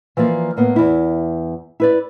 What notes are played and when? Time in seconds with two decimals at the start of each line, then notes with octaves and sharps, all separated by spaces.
0.17 E3 F3 A#3 D5
0.57 A2 A#3 B3
0.76 E2 E4
1.80 E4 B4 D5